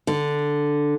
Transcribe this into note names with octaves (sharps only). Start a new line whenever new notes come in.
D3